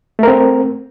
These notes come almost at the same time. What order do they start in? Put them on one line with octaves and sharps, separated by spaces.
A3 A#4 C4